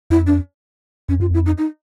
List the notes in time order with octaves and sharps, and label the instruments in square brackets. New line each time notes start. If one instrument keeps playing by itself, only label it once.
[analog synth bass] F2 [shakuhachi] E4
[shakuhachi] D4
[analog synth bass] F2 [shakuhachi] C#4
[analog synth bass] F#2 [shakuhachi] F4
[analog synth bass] F2 [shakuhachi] E4
[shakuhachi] D#4
D#4